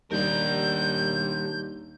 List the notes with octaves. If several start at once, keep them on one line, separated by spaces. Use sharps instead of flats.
D#2 G3 D4 A#4 G6